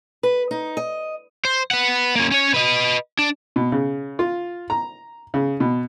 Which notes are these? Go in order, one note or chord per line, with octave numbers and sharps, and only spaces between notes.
B4
D#4
D#5
C5
B4 F#5
A#3 C#4
C#4 C#5
B4 D#5
D4
B2
C#3
F4
A#5
C#3
B2